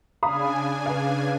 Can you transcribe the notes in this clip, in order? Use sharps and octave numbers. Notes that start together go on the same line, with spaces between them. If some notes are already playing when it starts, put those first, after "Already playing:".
C#3 D4 F5 G#5 B5 D#6
B4 F5